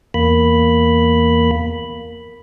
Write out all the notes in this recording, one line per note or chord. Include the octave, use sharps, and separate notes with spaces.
E2 A#3 B5